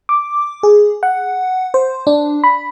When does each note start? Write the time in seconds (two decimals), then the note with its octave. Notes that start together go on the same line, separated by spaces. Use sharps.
0.09 D6
0.63 G#4
1.03 F#5
1.74 C5
2.07 D4
2.44 B5